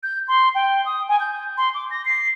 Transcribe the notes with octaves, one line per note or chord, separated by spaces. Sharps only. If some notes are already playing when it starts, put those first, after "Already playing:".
G6
C6
G5
D#6
G#5
G6
C6
D6
A#6
C7